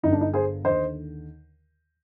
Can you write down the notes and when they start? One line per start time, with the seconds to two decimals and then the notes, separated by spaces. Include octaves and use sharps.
0.03 G1 G2 D3 D#4
0.12 D4
0.21 D#4
0.34 G#4 C5
0.64 D#2 D3 C5 D#5